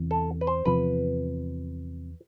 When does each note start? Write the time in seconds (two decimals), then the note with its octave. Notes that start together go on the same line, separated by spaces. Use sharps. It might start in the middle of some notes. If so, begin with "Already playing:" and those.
Already playing: E2 C3 E3
0.11 A4
0.41 B4
0.47 C5
0.65 E2 C3 F3 B4